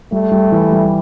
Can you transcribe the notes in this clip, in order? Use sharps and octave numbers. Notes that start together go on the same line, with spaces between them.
G3 A3
G3
E3
G3